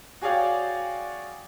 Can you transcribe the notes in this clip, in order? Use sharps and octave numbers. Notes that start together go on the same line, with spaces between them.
F#4 G#4 C#5 D5 F5 G5